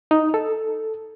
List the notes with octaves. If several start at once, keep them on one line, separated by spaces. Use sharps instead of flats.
D#4
A4